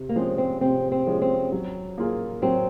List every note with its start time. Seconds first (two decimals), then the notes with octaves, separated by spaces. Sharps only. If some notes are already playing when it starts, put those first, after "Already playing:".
Already playing: C3
0.09 A#3
0.16 F3 G#3 C4 C#4 G#4
0.38 C4
0.61 C3 C4
0.92 C4
1.06 F3 G#3 C#4 G#4
1.22 C4
1.52 F#3
1.98 A#3 F4 G#4
2.42 F#3 C4